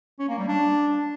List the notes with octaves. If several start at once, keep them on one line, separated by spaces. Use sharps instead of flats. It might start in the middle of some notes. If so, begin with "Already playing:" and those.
C#4
A#3
G3
D4